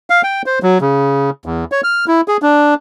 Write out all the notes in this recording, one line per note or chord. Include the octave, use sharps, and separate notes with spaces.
F5
G5
C5
F#3
C#3
E2
C#5
F6
E4
G#4
D4